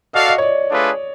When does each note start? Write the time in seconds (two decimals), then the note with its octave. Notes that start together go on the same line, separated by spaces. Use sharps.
0.13 F#4 A4 D5 D#5 F5
0.28 D#5
0.38 C#5
0.42 D5
0.70 A3 D4 F4 G#4 B4